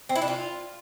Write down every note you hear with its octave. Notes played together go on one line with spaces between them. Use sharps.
C4
E4
D4
F4